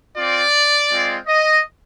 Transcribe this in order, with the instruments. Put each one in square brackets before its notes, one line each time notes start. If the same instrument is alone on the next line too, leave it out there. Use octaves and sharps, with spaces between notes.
[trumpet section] C4 F4 D5
G#3 C4 F4
D#5